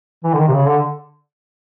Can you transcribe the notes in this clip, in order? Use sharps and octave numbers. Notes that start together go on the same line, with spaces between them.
E3
D3
D#3
C3
C#3
D3